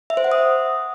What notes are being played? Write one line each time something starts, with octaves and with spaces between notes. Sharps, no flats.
E5
C5
F#5
D#6